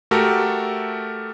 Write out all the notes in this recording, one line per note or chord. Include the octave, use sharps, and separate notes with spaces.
A3 F#4 G4 A4 A#4